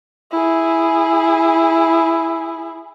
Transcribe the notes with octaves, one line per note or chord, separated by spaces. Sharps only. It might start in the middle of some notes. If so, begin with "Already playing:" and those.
E4 G#4